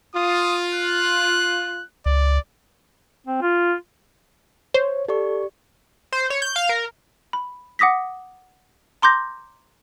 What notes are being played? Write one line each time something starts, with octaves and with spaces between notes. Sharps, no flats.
F4 D#6
F#6
C#2 D5
C4
F4
C5 C#5
G4 A4 D5 C#6
C5
C#5
G6
F5
A#4
B5
F#5 D6 D#6 A#6 B6
A#5 C6 D6 G6 A#6